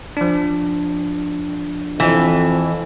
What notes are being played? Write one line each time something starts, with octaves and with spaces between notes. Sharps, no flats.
F3 D4
F2 E3